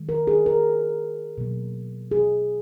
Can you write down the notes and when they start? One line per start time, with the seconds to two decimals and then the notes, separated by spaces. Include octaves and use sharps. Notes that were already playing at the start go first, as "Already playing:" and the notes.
Already playing: D#3 G#3
0.09 A#4
0.27 G#4
0.46 A#4
1.38 B2 F#3 A#3
2.11 G#4